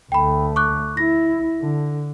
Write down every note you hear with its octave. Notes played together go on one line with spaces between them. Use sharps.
D2 A3 G5 B5
C#6 D6 F#6
E4 A#6
D3